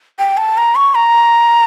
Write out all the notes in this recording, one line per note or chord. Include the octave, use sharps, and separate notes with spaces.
G5
A5
A#5
C#6
A#5